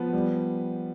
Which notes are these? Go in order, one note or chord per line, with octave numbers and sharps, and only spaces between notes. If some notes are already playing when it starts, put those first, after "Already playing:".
Already playing: F3 B3
G3